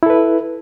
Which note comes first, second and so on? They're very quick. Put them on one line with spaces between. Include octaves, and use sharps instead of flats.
E4 A4 B4